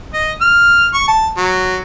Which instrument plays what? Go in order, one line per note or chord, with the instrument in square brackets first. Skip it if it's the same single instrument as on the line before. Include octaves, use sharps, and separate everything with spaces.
[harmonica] D#5
F6
C#6
A5
F#3